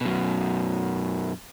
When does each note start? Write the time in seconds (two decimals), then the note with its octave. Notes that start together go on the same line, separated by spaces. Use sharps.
0.01 F#2 B2